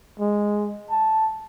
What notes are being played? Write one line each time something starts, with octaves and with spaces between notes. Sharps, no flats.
G#3
A5